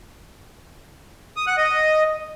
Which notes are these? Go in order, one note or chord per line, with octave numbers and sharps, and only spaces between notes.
D#6
F#5
D#5